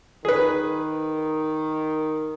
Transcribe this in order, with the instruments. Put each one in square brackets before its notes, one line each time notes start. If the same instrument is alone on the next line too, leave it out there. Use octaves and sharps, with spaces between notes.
[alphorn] D#3 [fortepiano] G#4 B4